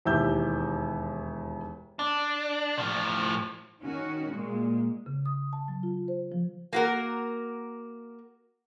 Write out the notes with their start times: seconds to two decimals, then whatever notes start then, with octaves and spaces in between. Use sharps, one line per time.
0.05 E1 D#2 E4 G4 E6 G6
1.99 D4
2.78 A2 F3
3.82 D#3 C#4 F#4
4.30 A#2 G#3
5.06 C#3
5.26 D#6
5.53 A5
5.68 F#3
5.83 F4
6.08 C5
6.32 F3
6.73 A#3 F#4 A#4